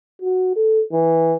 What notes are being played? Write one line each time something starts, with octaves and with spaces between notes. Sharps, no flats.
F#4
A4
E3